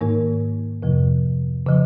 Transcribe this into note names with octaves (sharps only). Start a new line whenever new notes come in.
G#2 D#3 A#3 D#4 A#4
F2 C3 F3
C#3 F3